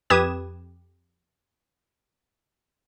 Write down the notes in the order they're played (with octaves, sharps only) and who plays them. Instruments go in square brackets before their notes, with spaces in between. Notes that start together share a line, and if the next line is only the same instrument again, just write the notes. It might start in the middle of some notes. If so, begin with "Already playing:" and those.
[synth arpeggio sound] F2 G4 B4 D#6 G#6 E7